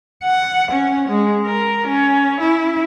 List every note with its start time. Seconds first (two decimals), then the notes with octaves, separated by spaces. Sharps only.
0.24 F#5
0.71 C#4
1.08 G#3
1.45 A#4
1.87 C#4
2.40 E4